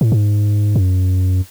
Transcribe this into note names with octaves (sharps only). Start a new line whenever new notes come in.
A2
G#2
F#2